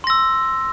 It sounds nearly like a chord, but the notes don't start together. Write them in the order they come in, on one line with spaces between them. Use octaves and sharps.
C6 A#6 E6